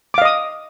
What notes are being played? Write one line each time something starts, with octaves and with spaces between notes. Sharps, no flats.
D#5 F5 D6 D#6